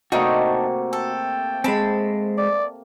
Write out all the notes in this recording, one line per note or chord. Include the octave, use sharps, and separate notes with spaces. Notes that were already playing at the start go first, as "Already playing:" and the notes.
C3 A3 A#3 D4 D#4 F#4
A4 G5
G#3 C4 A5 B5
D5